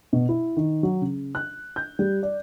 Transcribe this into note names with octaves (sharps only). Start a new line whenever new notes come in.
B2
E4
D#3
F#3
C#3
F#6
G6
G3
D5